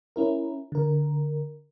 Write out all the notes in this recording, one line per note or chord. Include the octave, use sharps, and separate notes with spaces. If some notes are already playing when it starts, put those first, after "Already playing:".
C#4 E4 A#4
D3 A#4